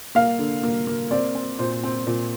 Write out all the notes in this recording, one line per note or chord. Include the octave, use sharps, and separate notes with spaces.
A#3 F5
D3
A#3
A#3
C4 D5
C4
A#2 C5
C4
A#2